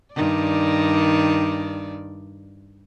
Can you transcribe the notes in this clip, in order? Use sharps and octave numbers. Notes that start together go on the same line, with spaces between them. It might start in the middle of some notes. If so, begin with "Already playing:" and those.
G2 D#3 D5